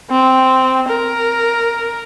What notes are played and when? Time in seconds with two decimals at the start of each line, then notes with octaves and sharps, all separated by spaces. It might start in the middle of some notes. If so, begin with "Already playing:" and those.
0.10 C4
0.88 A#4